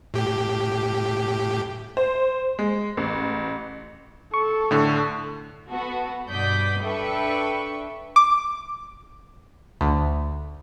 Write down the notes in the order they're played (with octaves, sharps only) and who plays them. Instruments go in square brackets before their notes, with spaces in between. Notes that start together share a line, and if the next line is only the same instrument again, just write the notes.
[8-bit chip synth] A2 G4
[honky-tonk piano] C5
G#3
A1
[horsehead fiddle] A4 [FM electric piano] C#6
[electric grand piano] A2 D3
[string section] B3 F#4 A4
G2 B2 D5 D#6 G6 B6
D4 A4 B4 E5 G5 C#6
[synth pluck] D6
D2